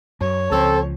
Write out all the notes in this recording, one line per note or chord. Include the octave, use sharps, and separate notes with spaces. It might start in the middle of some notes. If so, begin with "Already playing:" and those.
F#2 C#5
C#2 F3 C4 A4